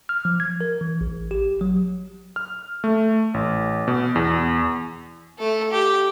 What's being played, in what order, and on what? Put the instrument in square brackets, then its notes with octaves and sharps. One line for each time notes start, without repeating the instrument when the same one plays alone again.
[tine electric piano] F6
F3
G#6
A#4
E3
A1
G4
F#3
[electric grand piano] F6
A3
A1
B2
E2
[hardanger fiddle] A3 A4
G4